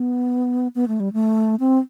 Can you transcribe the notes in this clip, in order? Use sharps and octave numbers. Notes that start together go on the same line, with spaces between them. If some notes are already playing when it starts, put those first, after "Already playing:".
Already playing: B3
B3
A3
G3
A3
C4